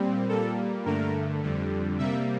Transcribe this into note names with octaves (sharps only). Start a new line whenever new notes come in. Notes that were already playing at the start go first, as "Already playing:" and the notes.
Already playing: A#2 G3 C4
A#2 G3 A#3 A4
G2 D3 A3 A#4
F2 D3 G3
C3 G3 A#3 E5